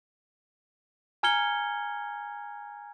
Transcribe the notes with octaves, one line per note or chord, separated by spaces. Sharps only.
G#5 A#5 F6 G#6 C#7 G7